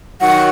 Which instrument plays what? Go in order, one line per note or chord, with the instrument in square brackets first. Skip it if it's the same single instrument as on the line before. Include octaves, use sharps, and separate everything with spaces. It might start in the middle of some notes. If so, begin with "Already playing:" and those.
[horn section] D#3 F#3 [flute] F#5